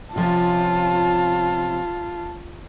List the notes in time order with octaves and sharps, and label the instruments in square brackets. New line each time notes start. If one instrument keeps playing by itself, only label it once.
[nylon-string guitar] C3 F3 C#4 [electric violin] F4 [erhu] A5